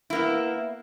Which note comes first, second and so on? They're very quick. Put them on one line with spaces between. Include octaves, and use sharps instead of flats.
E4 A#3 B3